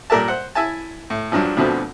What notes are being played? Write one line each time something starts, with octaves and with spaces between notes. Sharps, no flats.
A#2 G3 A#4 D5 E5 A5
C5 F#5
E4 E5 G#5 A5
A2
G2 F3 F#3 D4
D2 B2 D3 F3 C4